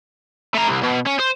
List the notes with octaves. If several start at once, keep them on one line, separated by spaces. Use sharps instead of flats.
A3 A#5
C2
B2
C#4
C5